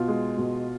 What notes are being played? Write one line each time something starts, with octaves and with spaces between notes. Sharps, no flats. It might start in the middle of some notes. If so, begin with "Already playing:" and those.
Already playing: B2 F4
G#3
B2